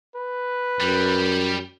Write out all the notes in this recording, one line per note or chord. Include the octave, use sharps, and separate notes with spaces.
B4
F#2 G3